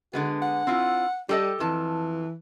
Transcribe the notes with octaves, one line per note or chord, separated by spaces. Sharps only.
D3 G#3 B3 F#4
F#5
C4 E4 F4
G3 G4 A4 D#5
F2 E3 A5